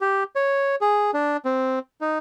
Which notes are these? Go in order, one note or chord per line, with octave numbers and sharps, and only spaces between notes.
G4
C#5
G#4
D4
C4
D#4